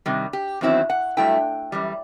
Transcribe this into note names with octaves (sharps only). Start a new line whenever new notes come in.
C3 D#3 G3
G4
E2 D#3 F#3 C4 E4
F#5
G2 F#3 A3 E4 G5
F#2 E3 G3